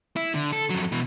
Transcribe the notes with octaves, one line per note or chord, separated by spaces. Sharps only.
E4
D3
A4
F2 F#3
B2 E3